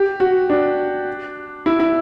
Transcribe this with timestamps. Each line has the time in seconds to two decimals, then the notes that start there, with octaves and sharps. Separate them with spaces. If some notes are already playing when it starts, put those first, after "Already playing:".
Already playing: G4
0.20 F#4
0.50 D4
1.66 E4
1.80 E4